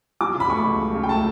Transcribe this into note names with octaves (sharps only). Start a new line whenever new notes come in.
F#3 D6
C#3
B5
A3 C#6
C#2
F#3
C#3
G5
A3 A5